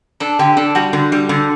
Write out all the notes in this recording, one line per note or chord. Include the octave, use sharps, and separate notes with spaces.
D4 A4
D3 G4
D4 A4
G3 F#4
D3
G3
D3